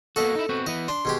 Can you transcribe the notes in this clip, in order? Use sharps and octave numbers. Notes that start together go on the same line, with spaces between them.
A#3 B3 F#4 A4 D#5
D#4 E4
B3 C4 F#4
E3 B3 D#5
D4 C6
B2 G#3 G4